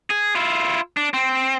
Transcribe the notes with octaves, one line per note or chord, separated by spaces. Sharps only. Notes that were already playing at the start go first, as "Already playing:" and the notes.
G#4
E4 F4
D4
C4